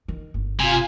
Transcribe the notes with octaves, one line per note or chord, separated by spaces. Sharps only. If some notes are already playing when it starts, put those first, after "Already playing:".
D#3
G1
C3 F4 G#5